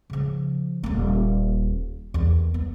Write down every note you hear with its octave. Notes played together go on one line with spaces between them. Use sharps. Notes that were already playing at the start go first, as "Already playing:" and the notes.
C#3 F3
D#1 A#3
E2 D#3
B3